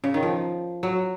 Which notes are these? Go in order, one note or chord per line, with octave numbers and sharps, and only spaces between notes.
C#3
D#3
F3
F#3